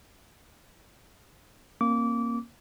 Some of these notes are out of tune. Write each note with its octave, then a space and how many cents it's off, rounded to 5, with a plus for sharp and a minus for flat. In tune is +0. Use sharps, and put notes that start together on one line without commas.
A#3 +0 C#4 -45 D6 -25